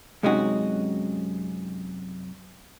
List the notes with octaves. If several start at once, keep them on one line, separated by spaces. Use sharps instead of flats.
F#2 C3 G#3 C#4 D#4 F#4